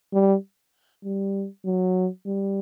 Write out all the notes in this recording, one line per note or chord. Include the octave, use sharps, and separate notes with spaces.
G3
G3
F#3
G3